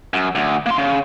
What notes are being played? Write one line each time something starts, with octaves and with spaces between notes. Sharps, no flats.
F#2
D2
A#3 C6
C#3